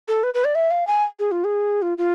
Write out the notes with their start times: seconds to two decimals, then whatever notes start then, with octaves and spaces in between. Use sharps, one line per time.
0.08 A4
0.23 B4
0.34 B4
0.44 D5
0.55 E5
0.71 F5
0.87 G#5
1.19 G#4
1.31 F4
1.44 G#4
1.82 F4
1.98 F4